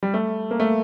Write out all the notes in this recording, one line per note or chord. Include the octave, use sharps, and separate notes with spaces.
G3
A3
A#3
A3